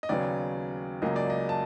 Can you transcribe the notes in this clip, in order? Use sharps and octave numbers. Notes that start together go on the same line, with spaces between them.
D#5
D#2 C#3 F#3 B3 D5
C#2 C#3 F#3 A#3 D#5
D5
D#5
A5